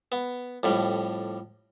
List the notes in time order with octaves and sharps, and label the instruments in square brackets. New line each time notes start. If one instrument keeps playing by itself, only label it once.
[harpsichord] B3
F2 A2 G3